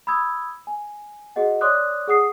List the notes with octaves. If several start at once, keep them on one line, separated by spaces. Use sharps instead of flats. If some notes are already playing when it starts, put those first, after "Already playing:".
B5 D#6 E6 G#6
G#5
F#4 G#4 D#5 F#5
C#5 D5 C6 D6 D#6 F#6
G#4 F#5 D#6 C7